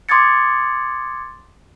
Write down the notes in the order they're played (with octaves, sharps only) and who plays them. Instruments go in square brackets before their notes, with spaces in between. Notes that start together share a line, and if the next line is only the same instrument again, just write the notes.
[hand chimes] C6 D6 D#6 G#6 A6 C#7